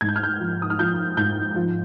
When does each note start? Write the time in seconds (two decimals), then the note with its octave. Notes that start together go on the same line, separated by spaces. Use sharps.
0.01 G#2 G#6
0.09 G6
0.16 F6
0.23 G6
0.40 F3
0.62 D#6
0.70 F6
0.79 F3 G6
1.17 G#2 G6
1.56 F3